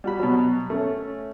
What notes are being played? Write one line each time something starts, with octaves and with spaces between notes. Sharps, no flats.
G3 F#4 B5
B2 F#3
A3 C#4